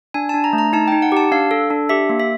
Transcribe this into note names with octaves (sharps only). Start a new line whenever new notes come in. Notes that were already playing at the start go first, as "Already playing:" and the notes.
D4 G#5
A5
D4
A#5
A3
A#5
D#4 A5
G5
D#4
F#5
G4 A5
D4 F5
A4
D4
G4 E5
A#3
E5